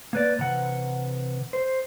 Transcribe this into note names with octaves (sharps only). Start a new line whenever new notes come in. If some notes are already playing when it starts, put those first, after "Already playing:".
A#3 B4 D5
C3 E3 F#5
C5